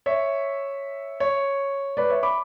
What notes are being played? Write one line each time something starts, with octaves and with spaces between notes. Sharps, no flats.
C#5 E5
C#5
B4 D5
C#5 E5
B5 D6